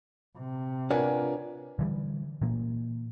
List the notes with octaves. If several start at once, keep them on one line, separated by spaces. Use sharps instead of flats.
C3
D4 F4 A#4 B4 C#5 D5 F#5 G#5
D3 E3 G3
A#2 E3 A#3